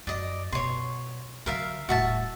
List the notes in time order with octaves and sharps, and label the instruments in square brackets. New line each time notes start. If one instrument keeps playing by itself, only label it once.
[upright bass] F#2 [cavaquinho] D5 D#5
[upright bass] B2 [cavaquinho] C#5 C6
[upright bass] D3 F#3 [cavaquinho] A#4 E5 F5
[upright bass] D#1 A2 [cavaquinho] F#4 E5 A5